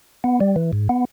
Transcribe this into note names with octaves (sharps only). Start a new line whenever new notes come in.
B3
G3
E3
G#2
B3